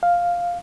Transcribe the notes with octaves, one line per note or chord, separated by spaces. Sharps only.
F5